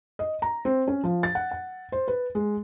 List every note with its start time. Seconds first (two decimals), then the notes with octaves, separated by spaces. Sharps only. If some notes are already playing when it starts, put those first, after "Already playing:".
0.19 D#5
0.42 A#5
0.65 C4
0.88 C#4
1.04 F3
1.23 A6
1.35 F#5
1.51 F#5
1.92 C5
2.08 B4
2.35 G#3